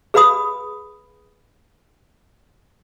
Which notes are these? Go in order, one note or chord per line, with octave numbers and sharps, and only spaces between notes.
G#4 B4 F5 B5 D#6